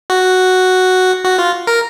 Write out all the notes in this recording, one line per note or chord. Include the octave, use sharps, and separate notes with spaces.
F#4
F#4
F4
A#4